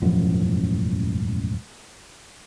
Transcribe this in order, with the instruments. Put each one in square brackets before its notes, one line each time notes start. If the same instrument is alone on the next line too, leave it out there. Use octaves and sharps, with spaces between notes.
[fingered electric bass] E1 A1 F#2 F3